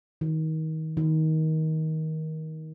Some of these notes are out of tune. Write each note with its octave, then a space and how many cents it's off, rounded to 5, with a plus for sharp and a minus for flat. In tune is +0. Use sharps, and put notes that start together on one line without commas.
D#3 +25
D#3 +20